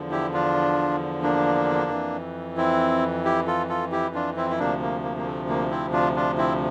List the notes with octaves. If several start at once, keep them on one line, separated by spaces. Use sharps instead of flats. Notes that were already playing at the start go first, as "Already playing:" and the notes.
Already playing: E2 D3 F3
E4 G4
D4 F4
A#3 D4
F2 E3
C4 E4
E4 G4
F4 A4
F4 A4
E4 G4
D4 F4
C4 E4
E4
D2 C3 F3 A#3 D4
A#3
A#3
A#3
A3
A#3
C4 E4
D4 F4
D4 F4
C4 E4